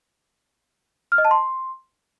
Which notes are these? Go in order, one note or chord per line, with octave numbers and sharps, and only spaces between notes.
F6
D#5
A5
C6